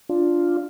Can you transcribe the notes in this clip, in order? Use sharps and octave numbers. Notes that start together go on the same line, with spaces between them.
D4 F4